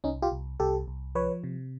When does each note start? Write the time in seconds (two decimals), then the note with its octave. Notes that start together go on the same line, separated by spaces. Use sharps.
0.04 C2 C#4 D#4
0.22 F4 G4
0.32 C2
0.60 C2 G4 A4
0.88 C2
1.15 F3 B4 C#5
1.44 C3